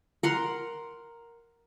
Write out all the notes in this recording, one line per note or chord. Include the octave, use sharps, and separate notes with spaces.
A#4 F#5 C6